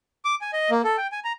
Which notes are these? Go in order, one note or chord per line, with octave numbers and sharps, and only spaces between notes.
D6
G#5
D#5
A#3
A4
G5
G#5
A#5